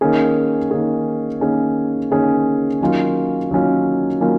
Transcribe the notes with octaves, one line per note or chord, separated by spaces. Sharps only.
D#3 A#3 C#4 G#4
D#3 A#3 C#4 G#4
D#3 A#3 C#4 G#4
D#3 A#3 C#4 G#4
D#3 F#3 A#3 C#4 F4
D#3 F#3 A#3 C#4 F4
D#3 F#3 A#3 C#4 F4